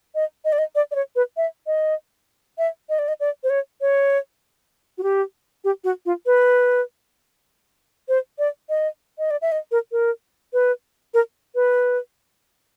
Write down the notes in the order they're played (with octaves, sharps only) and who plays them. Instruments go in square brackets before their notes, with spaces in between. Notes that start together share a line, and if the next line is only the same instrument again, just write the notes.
[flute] D#5
D#5
D5
D#5
D5
D5
C#5
B4
E5
D#5
E5
D#5
D5
D#5
D5
C5
C#5
C#5
F#4
G4
G4
F#4
F4
B4
C5
D5
D#5
D#5
D5
E5
D#5
A#4
A#4
B4
A#4
B4